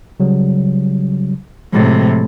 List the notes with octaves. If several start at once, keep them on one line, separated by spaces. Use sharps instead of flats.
C#3 F#3 G3
A2 C3 F3 G#3 A6